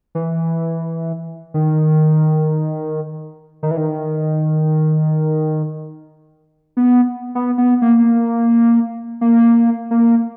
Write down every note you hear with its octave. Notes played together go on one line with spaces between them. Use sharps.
E3
D#3
D#3
E3
D#3
B3
B3
B3
A#3
A#3
A#3